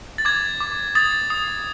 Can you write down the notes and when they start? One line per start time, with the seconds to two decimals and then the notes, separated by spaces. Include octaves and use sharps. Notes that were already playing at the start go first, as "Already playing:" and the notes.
0.18 A6
0.25 D6 G#6
0.60 D6
0.95 D#6 A6
1.30 D#6